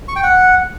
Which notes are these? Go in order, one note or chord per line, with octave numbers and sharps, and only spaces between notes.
C#6
G5
F#5